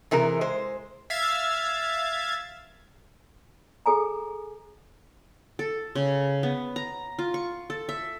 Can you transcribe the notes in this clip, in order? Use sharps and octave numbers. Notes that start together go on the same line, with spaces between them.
C3 E3 G#4 A#4
G#3 C5
E5 F5 G#6 A6
G#4 A4 G#5 A#5
A4
C#3
B3
A#5
F4
C#6
A4
E5